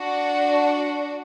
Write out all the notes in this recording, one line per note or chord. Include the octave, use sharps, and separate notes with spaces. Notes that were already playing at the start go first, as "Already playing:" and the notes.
Already playing: D4 F#4